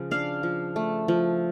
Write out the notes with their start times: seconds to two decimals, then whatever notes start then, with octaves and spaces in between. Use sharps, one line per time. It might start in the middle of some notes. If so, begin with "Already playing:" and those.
Already playing: C#3 F3
0.11 D4 F5
0.43 F3
0.76 A3
1.08 F3